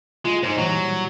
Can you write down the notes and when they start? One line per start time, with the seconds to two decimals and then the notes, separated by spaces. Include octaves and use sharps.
0.25 G#3 F4
0.43 G#2 G#3 D#4 C5
0.57 A#2 E3 F#3 G3